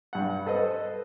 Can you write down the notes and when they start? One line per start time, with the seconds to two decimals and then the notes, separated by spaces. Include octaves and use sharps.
0.13 G2 F#5
0.46 A4 B4 C5 D#5